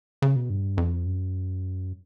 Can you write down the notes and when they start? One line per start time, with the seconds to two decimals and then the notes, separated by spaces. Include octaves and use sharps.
0.22 C#3
0.36 B2
0.50 G2
0.77 F2
1.05 F#2